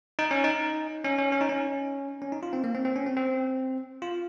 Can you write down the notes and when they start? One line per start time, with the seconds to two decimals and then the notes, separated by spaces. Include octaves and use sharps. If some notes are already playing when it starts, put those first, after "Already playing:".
0.19 D#4
0.31 C#4
0.44 D#4
1.04 C#4
1.18 C#4
1.32 C#4
1.41 D#4
1.49 C#4
2.22 C#4
2.32 D#4
2.43 F4
2.53 C4
2.64 A#3
2.75 C4
2.85 C4
2.96 C#4
3.07 C4
3.17 C4
4.02 F4